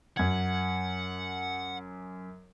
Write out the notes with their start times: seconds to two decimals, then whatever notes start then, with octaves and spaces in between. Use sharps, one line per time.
0.17 F#2 F#5 G#6